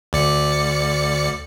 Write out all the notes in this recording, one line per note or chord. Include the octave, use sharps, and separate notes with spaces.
D2 D5 C#7